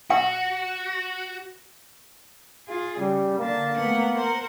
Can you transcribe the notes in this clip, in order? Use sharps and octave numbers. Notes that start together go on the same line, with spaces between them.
F#4 F#5
F4 G#4
C#3 G3
D3 A#3 D4 A5
A3 B3 F#5
A#4 C5 F#5